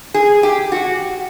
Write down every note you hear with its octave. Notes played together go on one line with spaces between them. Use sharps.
G#4
G4
F#4